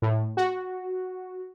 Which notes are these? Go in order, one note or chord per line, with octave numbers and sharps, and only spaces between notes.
A2
F#4